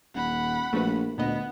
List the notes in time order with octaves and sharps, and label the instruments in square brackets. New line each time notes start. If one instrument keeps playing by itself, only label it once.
[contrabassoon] D#1 [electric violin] F#5 B5
[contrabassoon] A#1 [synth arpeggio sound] A3 F#4 B4
[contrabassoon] D2 [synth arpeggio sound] A#2 D#5 [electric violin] B3